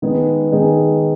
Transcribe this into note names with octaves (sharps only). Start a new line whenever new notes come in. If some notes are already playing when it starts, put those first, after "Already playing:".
D#3 G#3 B3 D#4 G#4
D#3 G#3 B3 D#4 G#4